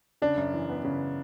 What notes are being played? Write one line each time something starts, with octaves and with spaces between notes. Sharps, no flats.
C#3 D4
F#2
E3
B3
C#3